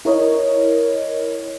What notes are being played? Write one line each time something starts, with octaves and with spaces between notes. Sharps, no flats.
E4 A#4 C#5 D#5